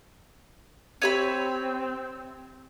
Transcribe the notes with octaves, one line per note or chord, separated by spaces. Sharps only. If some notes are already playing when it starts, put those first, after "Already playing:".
C4 G4 C#5 E5 B5 D#7